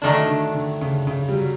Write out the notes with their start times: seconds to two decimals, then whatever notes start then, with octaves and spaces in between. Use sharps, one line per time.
0.02 D3 D#3 F#3 A3 D4
0.28 D3
0.55 D3
0.81 C#3
1.07 C#3
1.29 G3
1.34 F#3